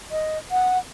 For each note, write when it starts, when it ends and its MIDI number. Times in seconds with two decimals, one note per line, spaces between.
0.12 0.38 75
0.51 0.78 78